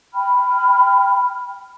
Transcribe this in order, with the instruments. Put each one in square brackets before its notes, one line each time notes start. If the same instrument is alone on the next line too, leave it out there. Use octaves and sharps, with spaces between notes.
[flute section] G5 B5 F6